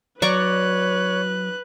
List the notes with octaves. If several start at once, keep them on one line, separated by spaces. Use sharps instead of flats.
F#3 B4 C#5 D5 A#5 C#6 F#6